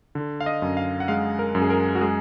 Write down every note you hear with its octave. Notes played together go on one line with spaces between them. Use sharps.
D3
F5
D#5
F#2
F5
F#5
G#3 F5
A#4
F#2
G#4
A#4
F#4
G#3 G#4